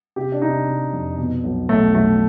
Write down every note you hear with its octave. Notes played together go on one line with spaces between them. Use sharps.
C3 G4
D4
C3 D#4
C3
F2
B2
B1
B1 A3
B1 A3